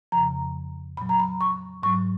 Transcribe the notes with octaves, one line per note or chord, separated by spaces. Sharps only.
F2 C#3 F3 A#5
A#2 F#3 B5
A#5
B5
C#6
G#2 F#3 C#6